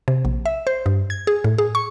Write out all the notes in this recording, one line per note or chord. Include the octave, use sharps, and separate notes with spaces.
C3
A#1
E5
C5
G2
G#6
G#4
A2
G#4
C#6